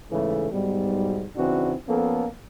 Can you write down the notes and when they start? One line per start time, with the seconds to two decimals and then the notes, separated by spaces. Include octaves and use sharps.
0.11 G#2 C#3 E3 A3
0.51 B1 G#2 B2 G3
1.36 C#3 E3 C4 D4 D#4 F#4
1.87 F3 A#3 B3 C#4 A4